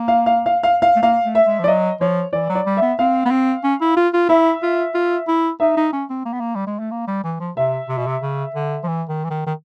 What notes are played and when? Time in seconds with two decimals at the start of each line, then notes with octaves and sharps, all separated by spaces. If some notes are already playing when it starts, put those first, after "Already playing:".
Already playing: A#3
0.08 F5
0.26 F5
0.46 F5
0.63 F5
0.82 F5
0.96 A3
1.02 A#3 F5
1.25 A3
1.35 E5
1.46 G#3
1.59 F3
1.64 D5
1.68 F#3 D#5
2.01 F3 C#5
2.33 E3 D5
2.49 F#3
2.55 D5
2.66 G3
2.77 B3 E5
2.99 C4 F5
3.25 B3
3.31 C4
3.63 C#4
3.81 E4
3.97 F4
4.13 F4
4.29 E4 E5
4.63 F4
4.94 F4
5.28 E4
5.60 D#4 E5
5.77 D#4
5.93 C#4
6.10 C4
6.25 A#3
6.33 B3
6.40 A#3
6.55 G3
6.67 G#3
6.79 A3
6.91 A#3
7.07 G3
7.24 E3
7.40 F3
7.57 C3 E5
7.89 C3
7.98 B2
8.07 C3
8.22 C#3
8.55 D3
8.84 F3
8.88 E3
9.08 D#3
9.25 E3
9.30 D#3
9.46 D#3